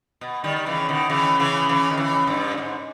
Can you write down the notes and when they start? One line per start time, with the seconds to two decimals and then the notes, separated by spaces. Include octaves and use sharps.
0.21 B2
0.44 D#3 G3
0.56 G3
0.66 C#3 E3
0.89 B2 D#3
1.10 C#3 E3
1.39 C#3 E3
1.69 C#3 E3
1.90 D#3
1.98 C#3 E3
2.27 G2
2.52 A#2
2.58 G#2